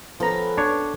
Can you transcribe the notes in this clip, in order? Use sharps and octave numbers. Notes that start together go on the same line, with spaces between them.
F3 B3 C#4 A4 B4 A#5
D4 C#5